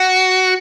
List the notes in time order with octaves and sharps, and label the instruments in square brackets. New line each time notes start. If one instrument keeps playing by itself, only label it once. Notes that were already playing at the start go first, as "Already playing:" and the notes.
Already playing: [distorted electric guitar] F#4